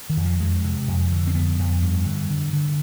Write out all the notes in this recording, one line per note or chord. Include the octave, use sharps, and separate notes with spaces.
D#3
F2
F3
F2 G#3
C3
F2
D3
C4
F2 B3
F2
G2
D3
D3
D3